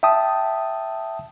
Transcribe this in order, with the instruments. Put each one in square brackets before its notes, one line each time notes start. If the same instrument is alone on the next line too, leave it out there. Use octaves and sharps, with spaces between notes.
[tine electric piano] E5 G5 A5 D#6